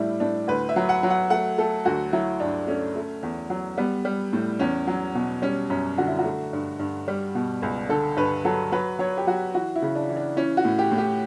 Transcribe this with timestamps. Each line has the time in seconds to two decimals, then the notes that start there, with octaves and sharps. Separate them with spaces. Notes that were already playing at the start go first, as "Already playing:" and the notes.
Already playing: A2 G3 D4 E4
0.20 A2 D4
0.47 D2 B4
0.69 E5
0.76 F#3
0.89 F#5
1.03 F#3
1.10 F#5
1.30 A3 F#5
1.58 A3 A4
1.85 D2 F#4
2.13 F#3 E4
2.40 G2 D4
2.67 A3 C#4
2.96 A3
3.23 E2
3.50 F#3
3.77 G3 B3
4.05 G3
4.33 A2
4.59 E2 C#4
4.87 F#3
5.15 B2
5.42 G3 C#4
5.70 F#2 C#4
5.98 D3 F#4
6.08 E4
6.18 F#4
6.25 A3
6.53 G2
6.79 G2
7.08 G3
7.35 B2
7.62 C#2
7.89 D3 A4
8.16 G2 B4
8.44 F#3 A4
8.72 F#3 B4
8.99 F#3 C#5
9.17 G4
9.27 F#3 F#4
9.55 E3 F#4
9.76 E4
9.82 C#3
9.95 D4
10.09 E3
10.17 D4
10.36 E3 C#4
10.57 F#4
10.65 A2
10.79 G4
10.92 A2
10.98 G4